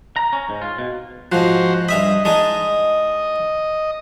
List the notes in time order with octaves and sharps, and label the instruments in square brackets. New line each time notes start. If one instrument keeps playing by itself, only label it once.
[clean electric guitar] A#5
C#4
G#2
F4
B2
[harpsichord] G#2 F3 [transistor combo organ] F#4 C5
[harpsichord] G2 E5 B5 [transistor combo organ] D#5
[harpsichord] G#3 D4 D#4 [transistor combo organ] D#5